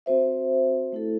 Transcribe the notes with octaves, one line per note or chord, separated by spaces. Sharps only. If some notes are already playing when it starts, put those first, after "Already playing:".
C4 F#4 C5 E5
A3 E4 A4